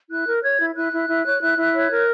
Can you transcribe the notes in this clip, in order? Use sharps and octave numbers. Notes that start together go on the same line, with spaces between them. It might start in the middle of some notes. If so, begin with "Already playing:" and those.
E4 F#6
A#4
C#5 G#6
E4
E4 F#6
E4
E4
C#5
E4
E4
C#5
A#4